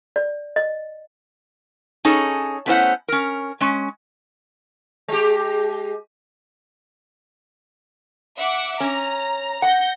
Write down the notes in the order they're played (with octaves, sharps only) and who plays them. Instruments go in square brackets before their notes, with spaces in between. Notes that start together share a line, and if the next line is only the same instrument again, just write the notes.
[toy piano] D5
D#5
[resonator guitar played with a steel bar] C#4 D#4 G#4 A4 C#5
A3 B3 C#4 E4 C5 F#5
C#4 A#4
G#3 C#4
[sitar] G#3 G4
[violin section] E5 F#5 D6
[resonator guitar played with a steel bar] C#4 [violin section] A#5
[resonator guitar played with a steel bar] F#5 [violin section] G6 A#6 C#7